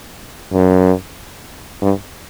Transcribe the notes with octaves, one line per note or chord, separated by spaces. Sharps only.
F#2
G2